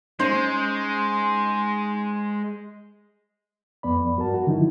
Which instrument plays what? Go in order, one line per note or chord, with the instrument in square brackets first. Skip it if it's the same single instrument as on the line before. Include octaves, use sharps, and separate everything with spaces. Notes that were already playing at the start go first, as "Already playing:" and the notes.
[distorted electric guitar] G#3 [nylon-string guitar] C#4 D#4 [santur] C5
[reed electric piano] F2 B3 D5 B5
G2 F#4 A#4 A5
F#4
D3 F3 D#4 E4